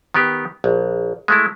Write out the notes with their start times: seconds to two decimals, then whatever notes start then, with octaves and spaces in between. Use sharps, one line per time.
0.14 D#3 B3 G4
0.64 A#1
1.28 G#3 A3 E4